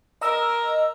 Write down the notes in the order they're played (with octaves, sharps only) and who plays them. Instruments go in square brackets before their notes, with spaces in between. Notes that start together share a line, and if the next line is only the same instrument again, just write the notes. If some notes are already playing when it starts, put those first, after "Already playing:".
[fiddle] A#4 [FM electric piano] D#5 A#5 E6